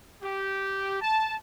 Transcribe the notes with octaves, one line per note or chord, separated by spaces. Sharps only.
G4
A5